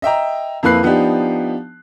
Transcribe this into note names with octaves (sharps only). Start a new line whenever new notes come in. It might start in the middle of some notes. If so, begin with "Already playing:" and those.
D#5 E5 G5 A#5
F2 A#3 E4 B4 F#6 C7
F3 B3 D4 D#4 G4